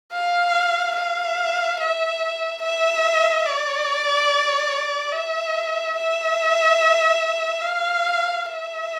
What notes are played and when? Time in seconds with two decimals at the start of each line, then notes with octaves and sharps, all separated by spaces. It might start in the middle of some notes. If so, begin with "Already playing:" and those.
0.13 F5
0.96 F5
1.80 E5
2.63 E5
3.45 D5
5.12 E5
5.96 E5
7.62 F5
8.45 E5